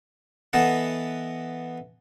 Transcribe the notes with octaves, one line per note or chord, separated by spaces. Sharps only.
E3 B3 A4 D#5 F#5 A5